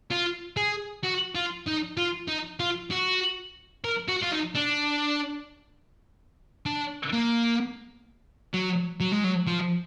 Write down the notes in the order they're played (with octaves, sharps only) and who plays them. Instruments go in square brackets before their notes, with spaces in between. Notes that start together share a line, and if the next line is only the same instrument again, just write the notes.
[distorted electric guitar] F4
G#4
F#4
F4
D#4
F4
D#4
F4
F#4
A#4
F#4
F4
D#4
D4
D4
A#3
F#3
F#3
G#3
F#3
F3